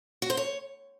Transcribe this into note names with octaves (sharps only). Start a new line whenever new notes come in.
F#4
C5
C#5